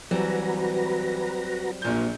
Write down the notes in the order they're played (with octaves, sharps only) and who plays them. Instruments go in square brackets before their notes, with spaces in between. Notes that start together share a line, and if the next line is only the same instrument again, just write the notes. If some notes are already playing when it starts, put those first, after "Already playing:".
[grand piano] E3 [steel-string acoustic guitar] F#3 G3 C4 [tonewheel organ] F#4 B4 A#5
[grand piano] A#1 A#2 G6